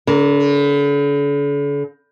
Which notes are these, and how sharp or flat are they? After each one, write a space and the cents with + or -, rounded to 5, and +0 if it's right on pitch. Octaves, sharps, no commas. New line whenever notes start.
D3 -45 A#4 +0